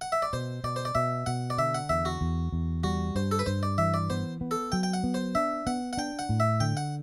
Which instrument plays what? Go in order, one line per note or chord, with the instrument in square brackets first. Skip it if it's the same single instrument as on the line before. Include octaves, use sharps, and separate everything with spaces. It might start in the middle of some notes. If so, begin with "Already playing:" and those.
[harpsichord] F#5
E5
D5
[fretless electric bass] B2 [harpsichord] C5
[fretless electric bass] B2 [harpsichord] D5
[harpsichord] C5
D5
[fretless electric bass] B2 [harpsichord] E5
[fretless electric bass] B2 [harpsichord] F#5
[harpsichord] D5
[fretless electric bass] D3 [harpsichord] E5
[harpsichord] F#5
[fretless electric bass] E2 [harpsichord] E5
[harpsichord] F#4
[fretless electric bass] E2
E2
[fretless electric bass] G3 [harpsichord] F#4
[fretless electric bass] G2 [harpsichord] C5
[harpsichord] A4
B4
[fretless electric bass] G2 [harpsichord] C5
[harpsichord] D5
[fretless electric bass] E3 [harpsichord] E5
[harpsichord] D5
[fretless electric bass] B3 [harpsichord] C5
[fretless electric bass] B3
[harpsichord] A4
[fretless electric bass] F#3 [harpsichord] G5
[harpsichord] G5
F#5
[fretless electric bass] B3
[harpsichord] C5
[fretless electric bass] D4 [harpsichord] E5
[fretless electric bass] B3 [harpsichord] F#5
[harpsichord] F#5
[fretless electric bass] D4 [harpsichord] G5
[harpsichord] F#5
[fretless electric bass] A2
[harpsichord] E5
[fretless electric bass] D3 [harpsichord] G5
[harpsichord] F#5